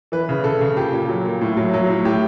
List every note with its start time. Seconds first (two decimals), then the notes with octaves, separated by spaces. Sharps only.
0.12 E3 B4
0.29 C#3
0.44 C#3 A4
0.61 C#3
0.76 A#2 G4
0.93 A#2
1.09 F#3
1.25 A#2
1.41 A2
1.57 F#3
1.74 F#3
1.88 A2
2.05 A2 G4